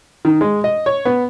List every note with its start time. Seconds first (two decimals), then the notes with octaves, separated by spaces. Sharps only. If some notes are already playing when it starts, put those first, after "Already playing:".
0.25 D#3
0.41 G#3
0.64 D#5
0.86 C#5
1.05 B3